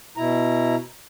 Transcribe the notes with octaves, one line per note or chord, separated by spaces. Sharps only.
B2 E4 A#5